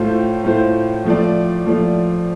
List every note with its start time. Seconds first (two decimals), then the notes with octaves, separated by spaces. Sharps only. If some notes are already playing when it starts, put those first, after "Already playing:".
Already playing: A2 A3 F4 C5
0.44 A2 A3 F4 C5
1.05 F3 A3 F4 D5
1.66 F3 A3 F4 D5